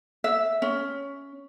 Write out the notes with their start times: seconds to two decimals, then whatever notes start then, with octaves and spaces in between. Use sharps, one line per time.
0.24 E5
0.62 C#4